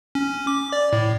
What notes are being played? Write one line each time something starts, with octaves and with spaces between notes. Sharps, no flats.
C#4
D6
D5
A2